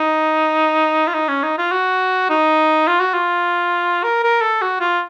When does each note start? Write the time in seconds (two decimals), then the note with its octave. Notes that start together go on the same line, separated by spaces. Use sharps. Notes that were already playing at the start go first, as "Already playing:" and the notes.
Already playing: D#4
1.08 F4
1.14 D#4
1.28 C#4
1.43 D#4
1.58 F4
1.72 F#4
2.30 D#4
2.87 F4
3.00 F#4
3.14 F4
4.04 A#4
4.23 A#4
4.41 A4
4.62 F#4
4.81 F4